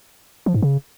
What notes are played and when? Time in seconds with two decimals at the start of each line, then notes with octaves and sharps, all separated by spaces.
0.46 F3
0.54 G#2
0.62 C#3